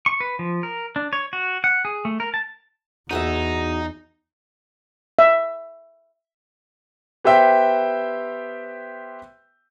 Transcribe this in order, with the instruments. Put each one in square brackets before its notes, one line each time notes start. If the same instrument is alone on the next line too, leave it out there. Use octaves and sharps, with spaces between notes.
[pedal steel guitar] C#6
B4
F3
A#4
D4
C#5
F#4
F#5
G#4
A3
A#4
A5
[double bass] E2 [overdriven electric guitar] D#4 [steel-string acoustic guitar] F#4 G#4 E5
[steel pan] E5
[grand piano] B3 G4 C5 E5 G5